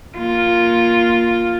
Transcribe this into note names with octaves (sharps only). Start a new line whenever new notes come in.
A#3 F4